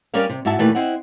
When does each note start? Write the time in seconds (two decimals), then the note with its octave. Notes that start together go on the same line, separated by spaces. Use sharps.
0.14 G3 C#4 A#4 C#5 D5 F5
0.30 C3
0.45 G#2 E4 F#4 E5 A5
0.59 A#2 D#3 E3 A3 G4 B4
0.75 C4 E4 D#5 F#5